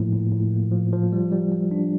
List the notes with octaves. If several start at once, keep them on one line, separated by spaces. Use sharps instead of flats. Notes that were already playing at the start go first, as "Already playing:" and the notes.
Already playing: A2 F3 A#3
A2
A2
A#3
F3
F3
G3
G3
G3
D4